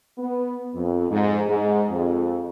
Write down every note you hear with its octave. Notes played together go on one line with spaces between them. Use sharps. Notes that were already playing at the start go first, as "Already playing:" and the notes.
B3
F2
G#2
G#2
F2